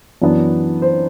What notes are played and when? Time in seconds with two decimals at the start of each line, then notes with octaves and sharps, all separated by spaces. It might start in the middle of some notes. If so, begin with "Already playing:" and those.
0.22 F#2 E3 B3 D4
0.82 C5